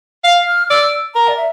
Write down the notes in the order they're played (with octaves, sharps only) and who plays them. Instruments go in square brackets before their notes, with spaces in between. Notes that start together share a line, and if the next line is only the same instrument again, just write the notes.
[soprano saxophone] F5
[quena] F6
[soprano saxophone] D5 [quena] E6
[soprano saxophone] A#4 [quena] A#5
[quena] D5
E5